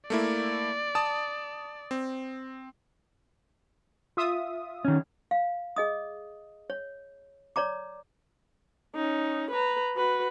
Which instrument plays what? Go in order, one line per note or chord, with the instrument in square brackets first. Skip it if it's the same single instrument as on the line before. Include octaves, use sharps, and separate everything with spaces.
[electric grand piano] A3 A#3 E4 [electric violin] D5
[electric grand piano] A5 D#6
C4
[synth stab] F4 E5 D#6
[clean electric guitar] D#3 C#4
[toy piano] F5
G#4 D#5 D#6
C#5
C#5 D5 A#5 D6
[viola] C#4 D#4
B4 A#5
F#4 B4